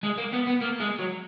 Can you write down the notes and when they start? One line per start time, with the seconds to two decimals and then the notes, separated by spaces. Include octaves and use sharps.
0.03 G#3
0.18 A#3
0.32 B3
0.47 B3
0.61 A#3
0.80 G#3
0.99 F#3